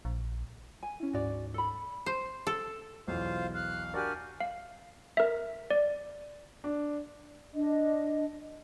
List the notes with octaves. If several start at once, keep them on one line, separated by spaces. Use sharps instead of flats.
A#1
G#5
C#4 E4
D2 G#2 F#4 D5
A4 B5
C5
A4
B1 E2 F4 C5 F5
F5 F6 F#6
D4 F#4 G4 A#4 D5 G#5 F6
F5
A#4 E5
D5
D4
D4 D#5